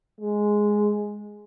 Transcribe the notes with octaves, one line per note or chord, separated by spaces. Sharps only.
G#3